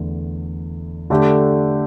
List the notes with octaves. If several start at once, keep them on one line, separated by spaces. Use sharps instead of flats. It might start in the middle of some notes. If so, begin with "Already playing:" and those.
Already playing: E2 D3 A3
D3 A3 D4 G4